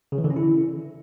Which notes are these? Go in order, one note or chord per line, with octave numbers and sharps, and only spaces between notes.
C#3
E3
D3
C#4
E4